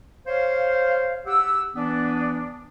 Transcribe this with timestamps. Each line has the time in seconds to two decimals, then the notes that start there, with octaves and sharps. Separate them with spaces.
0.27 C5 C#5 F5
1.26 G4 F#5 E6
1.74 E3 B3 D4